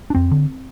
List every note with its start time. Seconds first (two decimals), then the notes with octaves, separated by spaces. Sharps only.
0.10 D4
0.15 F2 C4
0.31 D3